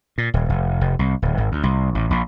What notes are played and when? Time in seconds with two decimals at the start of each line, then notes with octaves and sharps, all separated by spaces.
0.18 A#2
0.34 D#1
0.49 F1
0.81 F1
0.99 C2
1.22 D1
1.38 G#1
1.52 D2
1.63 C2
1.95 A1
2.10 A#1